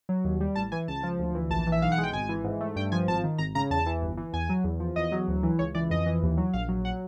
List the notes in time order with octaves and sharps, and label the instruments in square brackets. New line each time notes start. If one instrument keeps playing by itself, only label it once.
[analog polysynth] F#3
D#2
G3
A1 A5
E3 G#5
C#2 A5
F3
D2
E3
A#1 A5
E3
E5
B1 F5
F#5
G#3
G5
G#1 G#5
E3
G#2
A3
G2 G5
F3 G#5
G#1 A5
D#3
G#1 A#5
C#3 A#5
E2 A5
E3
G1
E3
E2 G#5
F#3
E2
F3
E2 D#5
F#3
D2
E3
C#2 C#5
E3 D5
F2 D#5
E3
D#2
F#3
A#1 F5
F#3
F#5